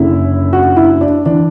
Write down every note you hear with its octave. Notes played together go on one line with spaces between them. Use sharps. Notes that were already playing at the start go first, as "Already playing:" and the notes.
Already playing: F#1 F#2 D3 E4
F#4
E4
D4
E3 D4